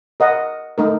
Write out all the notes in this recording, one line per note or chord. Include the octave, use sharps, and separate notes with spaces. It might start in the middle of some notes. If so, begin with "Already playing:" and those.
A#4 D#5 F#5
A3 D#4 A#4